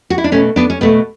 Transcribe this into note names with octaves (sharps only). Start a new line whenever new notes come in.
F#4
E4
D4
B2 A3 C#4
B3 D4
C#4
B2 A3 B3